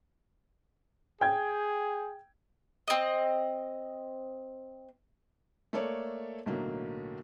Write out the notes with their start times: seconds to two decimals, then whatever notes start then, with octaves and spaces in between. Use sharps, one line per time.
1.21 G#4 G5 G#6
2.88 C4 D#5
5.73 A3 A#3 A4 C#5 D5
6.46 B1 A2 D3 F#3 A#3